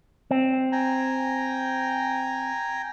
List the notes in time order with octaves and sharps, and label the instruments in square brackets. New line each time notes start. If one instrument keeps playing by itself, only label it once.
[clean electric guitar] C4
[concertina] G5 G#5 A#5